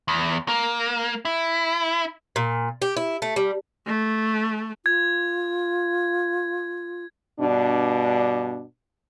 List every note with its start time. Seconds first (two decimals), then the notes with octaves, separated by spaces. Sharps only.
0.08 E2
0.48 A#3
1.25 E4
2.36 A#2
2.82 G4
2.97 E4
3.22 A3
3.36 G3
3.86 A3
4.86 F4 G#6
7.39 G2 B2 D4